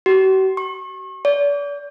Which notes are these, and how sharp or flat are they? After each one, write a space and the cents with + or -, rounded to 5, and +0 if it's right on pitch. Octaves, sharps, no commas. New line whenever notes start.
F#4 +45
C#6 -40
D5 -40